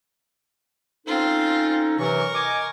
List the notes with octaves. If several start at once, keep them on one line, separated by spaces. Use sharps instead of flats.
C4 C#4 D#4 F4 A4
C3 E3 F#3 A#4 C#6
D#5 G#5 D6